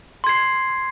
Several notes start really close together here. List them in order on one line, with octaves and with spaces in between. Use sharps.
C6 G#6 C7